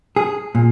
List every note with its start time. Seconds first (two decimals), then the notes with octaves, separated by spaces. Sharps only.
0.16 G#4
0.55 A#2